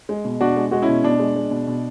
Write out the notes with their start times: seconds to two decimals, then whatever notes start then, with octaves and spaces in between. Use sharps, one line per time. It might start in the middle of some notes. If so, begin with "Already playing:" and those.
0.09 G#3
0.25 B2
0.41 B2 D4 F#4
0.56 G#3
0.71 G#3 F#4
0.82 C#4 E4
0.89 B2
1.04 B2 D4
1.19 G#3
1.35 G#3
1.51 B2
1.67 B2